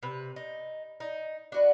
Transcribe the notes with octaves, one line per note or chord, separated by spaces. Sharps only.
C3 B4
D#4
D#4
D4 F#4 B4